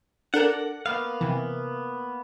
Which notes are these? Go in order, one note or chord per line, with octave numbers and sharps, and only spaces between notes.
D4 A4 A#4 F#5
A#3 B3 F5
C3 E3